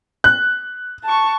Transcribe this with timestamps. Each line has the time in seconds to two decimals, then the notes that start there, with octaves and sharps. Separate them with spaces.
0.24 F#6
1.04 A5 C#6